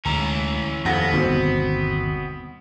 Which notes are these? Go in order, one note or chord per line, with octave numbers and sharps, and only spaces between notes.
D2 E3 G#3 C#4 A#5
D#1 F2 B3 F#5 A#6
G1 D#2 B2 C4